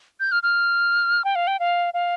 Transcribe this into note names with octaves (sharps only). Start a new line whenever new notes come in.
G6
F6
F6
G5
F5
G5
F5
F5